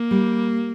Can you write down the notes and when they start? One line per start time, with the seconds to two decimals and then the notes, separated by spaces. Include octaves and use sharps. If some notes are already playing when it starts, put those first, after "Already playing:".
Already playing: A#3
0.11 G3